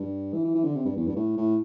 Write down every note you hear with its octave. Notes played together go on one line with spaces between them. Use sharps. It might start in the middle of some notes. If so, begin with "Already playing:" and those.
Already playing: G2
E3
E3
E3
D3
C3
G2
E2
G2
A2
A2